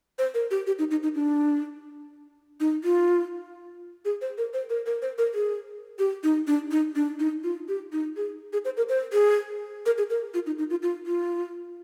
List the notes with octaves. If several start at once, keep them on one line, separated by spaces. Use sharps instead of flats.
C5
A#4
G4
G4
D#4
D#4
D#4
D4
D#4
F4
G#4
C5
A#4
C5
A#4
A#4
C5
A#4
G#4
G4
D#4
D4
D#4
D4
D#4
F4
G4
D#4
G#4
G#4
C5
A#4
C5
G#4
A#4
G#4
A#4
F4
D#4
D#4
F4
F4
F4